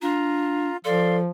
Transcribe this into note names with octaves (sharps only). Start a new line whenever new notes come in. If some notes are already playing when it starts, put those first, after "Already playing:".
D4 F4 A#5
F3 A4 D5 F5 C6